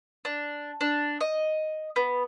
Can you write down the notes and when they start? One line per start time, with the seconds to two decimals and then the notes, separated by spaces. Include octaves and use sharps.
0.25 D4
0.81 D4
1.21 D#5
1.96 B3